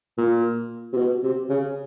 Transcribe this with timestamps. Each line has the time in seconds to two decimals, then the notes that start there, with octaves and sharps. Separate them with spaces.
0.18 A#2
0.93 C3
0.97 B2
1.23 C3
1.49 C#3